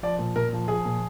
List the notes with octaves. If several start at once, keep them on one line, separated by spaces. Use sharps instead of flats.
F3 D5
A#2
A#2 A#4
F3
F3 G#4
A#2